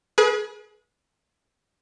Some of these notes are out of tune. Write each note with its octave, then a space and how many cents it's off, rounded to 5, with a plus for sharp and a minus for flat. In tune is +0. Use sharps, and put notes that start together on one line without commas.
G#4 +25 B4 -35